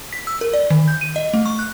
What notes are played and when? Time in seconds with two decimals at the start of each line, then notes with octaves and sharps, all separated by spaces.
0.13 B6
0.27 E6
0.41 A#4
0.53 D5
0.70 D#3
0.88 G6
1.01 D#7
1.16 D#5
1.34 A3
1.46 C#6
1.59 F#6